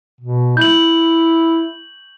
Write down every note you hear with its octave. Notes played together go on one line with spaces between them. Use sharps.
B2
E4 G6 F#7